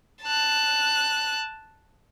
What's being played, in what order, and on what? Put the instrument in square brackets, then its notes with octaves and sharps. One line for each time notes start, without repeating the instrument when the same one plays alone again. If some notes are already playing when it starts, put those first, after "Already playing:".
[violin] A5 F#6